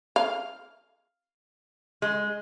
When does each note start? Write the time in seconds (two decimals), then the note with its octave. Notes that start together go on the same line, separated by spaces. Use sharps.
0.16 F5
2.02 G#3